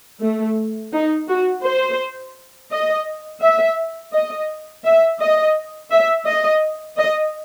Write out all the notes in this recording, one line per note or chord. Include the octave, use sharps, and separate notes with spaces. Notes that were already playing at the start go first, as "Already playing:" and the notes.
A3
D#4
F#4
C5
D#5
E5
D#5
E5
D#5
E5
D#5
D#5